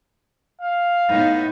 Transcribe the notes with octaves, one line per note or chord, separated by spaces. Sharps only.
F5
A2 B3 D#4